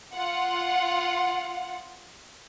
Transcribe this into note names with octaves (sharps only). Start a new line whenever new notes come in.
F4 F#5